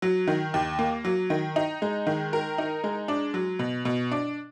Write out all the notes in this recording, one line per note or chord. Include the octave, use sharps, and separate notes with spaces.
F#3
D#3
D#2
A#3
F#3
D#3
D#4
G#3
D#3
A#4
D#4
G#3
D4
F#3
B2
B2
D4